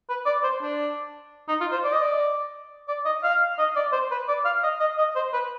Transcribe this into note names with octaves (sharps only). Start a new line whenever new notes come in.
B4
D5
C5
D4
D#4
F4
C5
D5
D#5
D5
D5
D#5
F5
D#5
D5
C5
B4
D5
F5
D#5
D#5
D#5
C5
B4